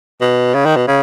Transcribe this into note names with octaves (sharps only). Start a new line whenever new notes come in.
B2
C#3
D#3
B2
C#3